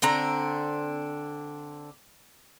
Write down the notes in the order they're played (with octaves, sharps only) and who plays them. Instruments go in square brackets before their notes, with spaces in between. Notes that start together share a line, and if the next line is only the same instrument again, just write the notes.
[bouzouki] D3 C4 D4 A#5